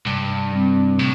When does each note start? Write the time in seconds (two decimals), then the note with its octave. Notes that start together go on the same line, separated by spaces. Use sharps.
0.05 G2 C3
0.53 G3 C4
0.98 A2 C3